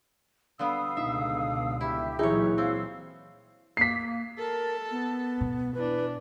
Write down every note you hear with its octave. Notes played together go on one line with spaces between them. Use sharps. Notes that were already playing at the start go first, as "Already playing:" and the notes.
D3 G3 B3 F5 D#6 E6
C#2 B2 D3 D#4 E5
E4 G4 E5 E6
A#2 E3 F#3 D#4 E4 G#4 C#5
C4 F5 E6
A#3 B6 C7
A4 A#4 A5
B3
B2
E3 D4 B4